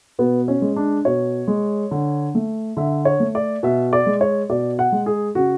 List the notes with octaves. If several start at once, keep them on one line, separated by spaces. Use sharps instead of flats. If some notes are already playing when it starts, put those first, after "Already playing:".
B2 B3
C#4
G#3
D4
B2 C#5
G#3
D3
A3
D3 E5
C#5
A3
D5
B2 E5
D5
G#3
C#5
B2 D5
F#5
G#3
G#4
C#3 F#4